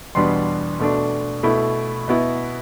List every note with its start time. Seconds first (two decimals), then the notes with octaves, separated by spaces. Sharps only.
0.15 E2 B2 G3 B3 D4 C6
0.79 B2 A3 D4
1.43 B2 A3 E4 B5
2.08 B2 B3 E4